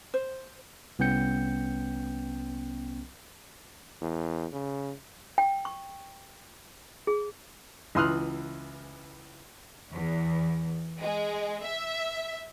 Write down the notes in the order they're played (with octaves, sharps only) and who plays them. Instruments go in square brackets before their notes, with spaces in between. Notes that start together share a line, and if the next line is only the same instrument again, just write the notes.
[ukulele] C5
[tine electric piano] C2 B3 C#4 G5 G6 C#7
[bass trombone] E2
C#3
[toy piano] G5
C#6
G#4
[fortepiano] C#2 E3 C6 D#6 F6 F#6
[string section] E2
G#3
E5